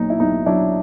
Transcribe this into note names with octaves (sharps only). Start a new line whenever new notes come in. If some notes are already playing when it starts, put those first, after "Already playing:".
Already playing: B1 A#2 F#3 D#4
E4
B1 D#4
F#3 D4 E4